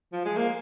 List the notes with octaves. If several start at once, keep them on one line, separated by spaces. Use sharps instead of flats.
F3
G#3
A#3